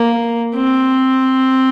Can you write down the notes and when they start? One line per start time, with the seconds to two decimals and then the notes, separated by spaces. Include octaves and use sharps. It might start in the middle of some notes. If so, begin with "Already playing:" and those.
Already playing: A#3
0.56 C4